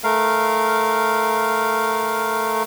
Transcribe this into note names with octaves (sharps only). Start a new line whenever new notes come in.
A3 A#4 F5